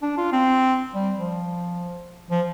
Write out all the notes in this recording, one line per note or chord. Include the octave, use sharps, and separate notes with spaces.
D4
F4
C4
G3
F3
F3